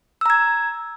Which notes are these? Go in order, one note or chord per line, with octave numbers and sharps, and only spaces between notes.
A#5 E6 G#6